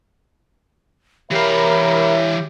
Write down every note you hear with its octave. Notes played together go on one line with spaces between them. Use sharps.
E3 G4 A#4 C#5 E5 F5 B5